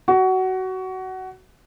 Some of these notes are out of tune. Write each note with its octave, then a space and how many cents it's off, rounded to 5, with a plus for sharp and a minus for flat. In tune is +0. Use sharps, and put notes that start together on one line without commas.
F#4 +20